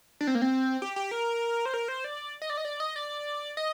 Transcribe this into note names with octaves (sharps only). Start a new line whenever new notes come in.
D4
C4
A#3
C4
G4
G4
A#4
C5
A#4
C5
D5
D#5
D5
D#5
D5
D#5
D5
D#5